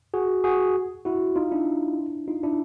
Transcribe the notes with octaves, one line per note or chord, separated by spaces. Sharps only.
F#4 G#4
F#4 G#4
E4 F#4
D#4 F4
D4 E4
D#4 F4
D4 E4